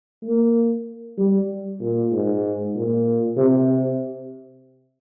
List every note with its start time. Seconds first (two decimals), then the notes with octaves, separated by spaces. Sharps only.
0.23 A#3
1.18 G3
1.80 A#2
2.12 G#2
2.74 A#2
3.37 C3